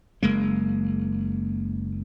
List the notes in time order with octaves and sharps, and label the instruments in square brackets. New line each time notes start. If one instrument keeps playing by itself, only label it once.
[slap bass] F#1 G#3 A#3